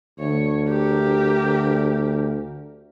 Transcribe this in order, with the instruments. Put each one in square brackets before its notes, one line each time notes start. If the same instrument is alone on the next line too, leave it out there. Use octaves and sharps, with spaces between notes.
[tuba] D2 [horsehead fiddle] C#5
[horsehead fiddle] G4 A#4